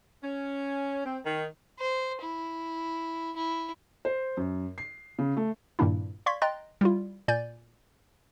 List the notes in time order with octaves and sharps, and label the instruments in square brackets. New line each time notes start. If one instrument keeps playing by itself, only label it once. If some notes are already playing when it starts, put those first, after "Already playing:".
[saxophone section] C#4
C4
D#3
[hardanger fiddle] C5
E4
E4
[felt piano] C5
F#2
C7
C#3
A3
[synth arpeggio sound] G2 A#2 D#3 A#3 D4 E4
D5 F5 C6 C#6 G#6 B6
D#5 G5 A#5 C6 F#6 A6
G3 E4 F4
A#2 D5 G#5 G6 A6